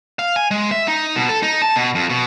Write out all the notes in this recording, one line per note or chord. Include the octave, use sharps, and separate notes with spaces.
F5
G#5
G#3
E5
D#4
B2
A4
D#4
A5
B2
F2
B2